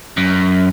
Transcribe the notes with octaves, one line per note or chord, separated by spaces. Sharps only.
F#2